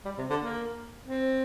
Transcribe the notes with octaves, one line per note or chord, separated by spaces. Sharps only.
G3
C3
D3
A#3
C4